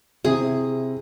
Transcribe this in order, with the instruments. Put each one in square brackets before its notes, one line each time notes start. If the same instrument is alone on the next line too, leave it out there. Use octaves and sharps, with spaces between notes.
[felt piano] C3 E4 [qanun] G#4